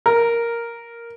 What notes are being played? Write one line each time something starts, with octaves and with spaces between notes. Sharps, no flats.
A#4